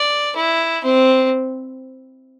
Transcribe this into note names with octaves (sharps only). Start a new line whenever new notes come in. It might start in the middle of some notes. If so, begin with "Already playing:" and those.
Already playing: D5
E4
C4